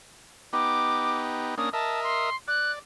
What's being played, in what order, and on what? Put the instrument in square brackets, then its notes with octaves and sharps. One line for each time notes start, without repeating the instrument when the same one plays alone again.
[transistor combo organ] B3 D#4 G4 [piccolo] D6
[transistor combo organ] A#3 C#4 D4 [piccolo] D#6
[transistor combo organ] A#4 D#5 E5 [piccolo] A5
[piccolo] C6
[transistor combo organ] D5 [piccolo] F#6